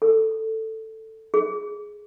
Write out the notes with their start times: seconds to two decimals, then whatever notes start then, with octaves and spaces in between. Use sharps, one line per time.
0.02 A4
1.34 G#4